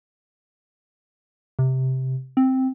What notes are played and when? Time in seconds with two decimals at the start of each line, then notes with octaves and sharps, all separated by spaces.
1.59 C3
2.37 C4